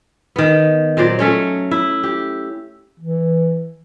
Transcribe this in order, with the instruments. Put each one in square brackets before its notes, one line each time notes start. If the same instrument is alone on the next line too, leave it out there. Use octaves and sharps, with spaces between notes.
[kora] D#3 B3
A#2 F#3 C5 D5
A3 C#4 C#5
E4
G4
[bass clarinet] E3